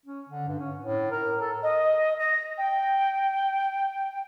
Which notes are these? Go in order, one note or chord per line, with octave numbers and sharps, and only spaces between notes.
C#4
D3
G2
C#4
A2
A#4
A4
D#5
A#6
G5